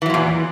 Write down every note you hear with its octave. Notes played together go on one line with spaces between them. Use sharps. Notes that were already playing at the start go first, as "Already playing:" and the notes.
E2 A#2 E3 F#3